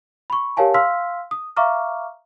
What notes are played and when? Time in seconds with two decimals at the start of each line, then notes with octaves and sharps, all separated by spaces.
0.30 B5 C#6
0.57 G4 A#4 C#5 F5 G#5 A5
0.74 F5 C6 E6 F6 B6
1.31 D#6
1.56 E5 F5 A#5 C#6 D6 F6